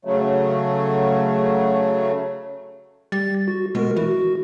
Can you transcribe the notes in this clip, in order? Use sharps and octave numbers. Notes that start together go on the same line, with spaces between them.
C#3 F#3 A3
G3 A6
F#4
B2 G#3 F#4 A#4
E3 F#4